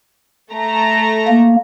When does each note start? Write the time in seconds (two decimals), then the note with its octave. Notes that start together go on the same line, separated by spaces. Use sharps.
0.51 A3 A#5
1.27 A#3